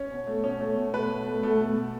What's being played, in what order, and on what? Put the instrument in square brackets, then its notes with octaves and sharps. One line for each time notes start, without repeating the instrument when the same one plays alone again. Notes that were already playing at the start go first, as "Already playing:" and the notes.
Already playing: [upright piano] C#4
B2
A3
B2 C#4
A3
B2
A3 B4
B2
A3
B2 A3
A3
B2